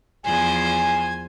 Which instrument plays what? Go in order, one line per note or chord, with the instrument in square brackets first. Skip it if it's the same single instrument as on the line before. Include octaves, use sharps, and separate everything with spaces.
[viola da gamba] E2 F3 C5 [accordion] G#5